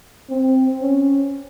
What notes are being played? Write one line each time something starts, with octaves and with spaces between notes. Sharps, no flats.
C4
C#4